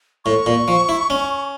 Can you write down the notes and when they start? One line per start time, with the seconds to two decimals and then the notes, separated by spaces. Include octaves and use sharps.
0.25 A2 C#6
0.46 A#2
0.68 F3
0.89 E4
1.10 C#4